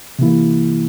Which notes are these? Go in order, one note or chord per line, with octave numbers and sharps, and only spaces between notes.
C3 E3 A#3 E4